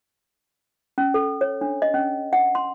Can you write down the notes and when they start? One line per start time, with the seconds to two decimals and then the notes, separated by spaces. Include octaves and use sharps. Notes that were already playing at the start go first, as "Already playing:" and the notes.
0.98 C#4
1.14 A4
1.41 C#5
1.61 D4
1.82 D#5
1.94 C#4
2.33 F#5
2.55 C6